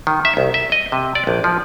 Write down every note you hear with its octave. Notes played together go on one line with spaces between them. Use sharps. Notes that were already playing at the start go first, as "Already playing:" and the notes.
D#3
E5
C2
E5
D#5
C3
D5
A#1
F3